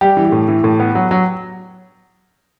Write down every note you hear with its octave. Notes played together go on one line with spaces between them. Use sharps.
G3 G4
E3
G4
A2
E3
A2
B3
F#3
F#3